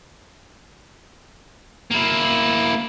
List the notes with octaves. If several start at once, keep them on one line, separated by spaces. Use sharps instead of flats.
A#3 E4